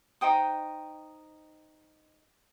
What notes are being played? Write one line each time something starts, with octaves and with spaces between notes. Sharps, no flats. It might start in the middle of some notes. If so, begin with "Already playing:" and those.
D#4 C5 G5 D#6